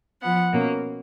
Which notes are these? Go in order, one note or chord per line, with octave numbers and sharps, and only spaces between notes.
F3 B3 F#5
B2 A#3 C#4